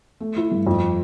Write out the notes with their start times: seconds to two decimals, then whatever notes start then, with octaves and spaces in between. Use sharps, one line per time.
0.20 A3
0.37 E4
0.51 G2
0.67 F2